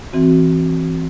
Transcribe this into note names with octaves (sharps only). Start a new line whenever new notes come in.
E3 C4 F#4